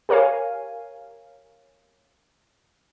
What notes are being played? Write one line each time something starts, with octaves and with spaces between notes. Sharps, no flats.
G4 A#4 C#5 F5 G#5